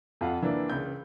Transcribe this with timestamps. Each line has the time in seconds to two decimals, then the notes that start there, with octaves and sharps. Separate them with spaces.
0.21 F2 F4 F5 F#5
0.43 E3 A#3 D4 E4
0.70 C#2 G6